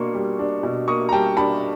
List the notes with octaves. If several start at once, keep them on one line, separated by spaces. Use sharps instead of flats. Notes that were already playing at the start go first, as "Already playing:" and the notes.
Already playing: B2 A#3 D4 C6 C#6
G3
D4
B2
A#3 C#6 D#6
A#5
G3 G5 A5
D4 A5 B5